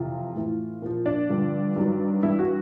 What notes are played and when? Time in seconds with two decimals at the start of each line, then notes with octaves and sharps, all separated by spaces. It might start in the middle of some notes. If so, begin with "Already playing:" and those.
Already playing: F2 C3 E3 F4
0.36 A2 E3
0.82 A#2 F3
1.06 D4
1.29 G2 D3 F3
1.76 G2 D#3 F#3
2.23 G2 E3 E4
2.39 F#4